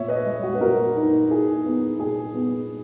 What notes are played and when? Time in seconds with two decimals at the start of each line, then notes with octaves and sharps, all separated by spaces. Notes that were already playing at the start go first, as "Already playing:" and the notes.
Already playing: A#2 C#5 E5
0.08 B4 D#5
0.26 G#3
0.43 F#4
0.55 B4
0.61 A#2 F#4 A#4
0.96 D#4
1.30 E4 G#4
1.65 B3
1.99 A#2 G#4
2.34 B3